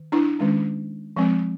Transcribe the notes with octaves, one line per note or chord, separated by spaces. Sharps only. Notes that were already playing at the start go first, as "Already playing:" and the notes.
Already playing: D#3
D4 E4
D#3 G#3 C#4
F3 G#3 C4